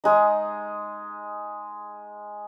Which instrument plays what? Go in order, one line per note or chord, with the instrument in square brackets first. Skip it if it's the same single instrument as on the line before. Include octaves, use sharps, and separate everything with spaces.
[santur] G#3 D#4